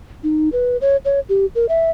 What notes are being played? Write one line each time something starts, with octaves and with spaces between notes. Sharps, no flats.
D#4
B4
C#5
C#5
G4
A#4
E5